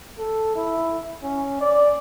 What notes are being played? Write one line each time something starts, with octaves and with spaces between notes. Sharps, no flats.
A4
E4
C#4
D5